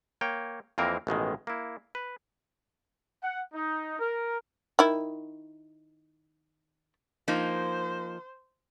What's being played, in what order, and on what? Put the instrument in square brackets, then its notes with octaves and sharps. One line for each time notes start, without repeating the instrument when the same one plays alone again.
[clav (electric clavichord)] A#3 C#5 G5
F2 E3 A#3 C4 A#4
A1 B2 D#3 G#3
A#3 E4
B4
[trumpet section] F#5
D#4
A#4
[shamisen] D#3 E4
[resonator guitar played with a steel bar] F3 A#3 D#4 [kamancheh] C5